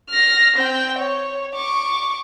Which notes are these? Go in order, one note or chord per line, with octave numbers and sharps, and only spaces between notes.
F6 A#6
C4 G5
C#5
C#6 D6